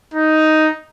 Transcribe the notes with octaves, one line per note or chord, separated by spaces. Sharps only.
D#4